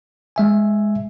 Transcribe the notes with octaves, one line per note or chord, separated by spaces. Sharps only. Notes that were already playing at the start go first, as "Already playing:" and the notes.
G#3 E5 G#5